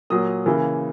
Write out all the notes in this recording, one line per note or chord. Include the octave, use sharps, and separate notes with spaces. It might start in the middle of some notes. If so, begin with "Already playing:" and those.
A#2 F#3 A#3 D#6
C#3 E3 A#3